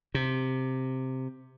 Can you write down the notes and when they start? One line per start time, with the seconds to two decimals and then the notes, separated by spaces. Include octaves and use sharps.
0.14 C3